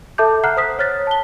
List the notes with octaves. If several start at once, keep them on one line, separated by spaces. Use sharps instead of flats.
A4 E5 A5 D6 G6
F#5 A#5 F6 F#6 C7
C5 D#6 B6
C#5 F6 F#6 A6 B6
A5 G7